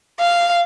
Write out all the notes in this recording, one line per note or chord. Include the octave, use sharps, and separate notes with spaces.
F5